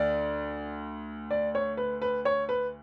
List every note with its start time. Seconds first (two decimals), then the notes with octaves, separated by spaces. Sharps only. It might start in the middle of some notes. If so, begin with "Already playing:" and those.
Already playing: D2 D5
1.31 D5
1.55 C#5
1.77 B4
2.02 B4
2.25 C#5
2.49 B4